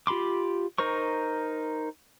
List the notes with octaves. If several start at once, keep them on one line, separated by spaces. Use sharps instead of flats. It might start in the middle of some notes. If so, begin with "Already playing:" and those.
F4 G4 B5 C6 D6
D#4 A#4 C5 C#6